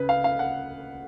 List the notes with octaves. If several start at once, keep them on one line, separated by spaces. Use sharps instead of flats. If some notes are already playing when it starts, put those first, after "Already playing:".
Already playing: C#3 B4
F5
F5
F#5